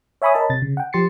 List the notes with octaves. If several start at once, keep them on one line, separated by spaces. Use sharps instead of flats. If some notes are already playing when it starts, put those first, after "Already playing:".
C#5 E5 G#5 B5 C#6 D#6
A#4 C#5 D#5 A5 B5
C3 A6
C#3
F#5 G5
F3 G4 C6 A6 C7 C#7